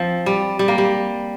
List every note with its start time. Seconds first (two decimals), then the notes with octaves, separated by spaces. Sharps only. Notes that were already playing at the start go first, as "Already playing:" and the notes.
Already playing: F3 C4
0.26 G3
0.59 G3
0.68 A#3
0.78 G3